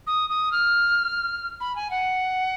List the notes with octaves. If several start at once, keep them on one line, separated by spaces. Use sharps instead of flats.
D#6
D#6
F6
B5
G#5
F#5